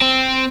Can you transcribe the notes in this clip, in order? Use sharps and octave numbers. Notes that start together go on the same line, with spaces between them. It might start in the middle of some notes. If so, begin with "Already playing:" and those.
C4